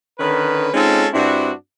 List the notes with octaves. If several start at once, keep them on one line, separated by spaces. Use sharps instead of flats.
D3 D#3 C#4 B4
G#3 C4 C#4 D#4 F4 A4
G2 C4 D4 E4 F#4